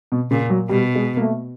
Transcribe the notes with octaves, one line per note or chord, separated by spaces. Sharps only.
B2
A#2 C#3
F#3
B2 G3
G#3
A#3
A3